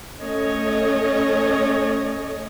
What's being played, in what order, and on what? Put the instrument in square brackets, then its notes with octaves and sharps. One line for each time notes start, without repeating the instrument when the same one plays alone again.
[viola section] A3 C#4 A4 C#5 D#5